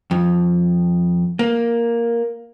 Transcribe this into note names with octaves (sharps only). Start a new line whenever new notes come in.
F2
A#3